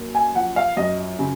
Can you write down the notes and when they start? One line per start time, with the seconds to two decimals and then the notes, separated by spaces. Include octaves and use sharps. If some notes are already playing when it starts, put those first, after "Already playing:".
Already playing: F#2 A#3
0.15 G#5
0.35 F3 F#5
0.56 F5
0.77 F#2 D#5
1.19 C#3